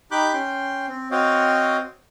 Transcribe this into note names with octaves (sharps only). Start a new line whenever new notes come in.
D#4 G4 B5 D6 F#6 G6
C#4 G5 C6
C4
C4 F#4 C#5 D#5 F5 G5